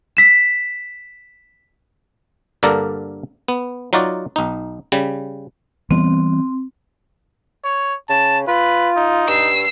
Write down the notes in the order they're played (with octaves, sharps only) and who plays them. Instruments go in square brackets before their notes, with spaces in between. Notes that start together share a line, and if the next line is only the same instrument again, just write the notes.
[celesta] B6 E7
[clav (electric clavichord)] G2 D3 A#3 A4 A#4 D5
B3
F#3 D#4 F4 F#4 D5
B1 D#4
C#3 G3
[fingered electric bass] E3 G3 B3 [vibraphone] C4
[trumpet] C#5
[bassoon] C#3 [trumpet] A5
[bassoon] F4 [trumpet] B4
[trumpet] D#4
[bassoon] G2 [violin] E6 C7